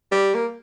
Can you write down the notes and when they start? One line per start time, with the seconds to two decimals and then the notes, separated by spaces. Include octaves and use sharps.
0.12 G3
0.34 A#3